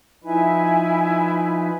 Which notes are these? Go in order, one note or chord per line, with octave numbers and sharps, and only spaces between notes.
F3 D#4 E4 B4 G#5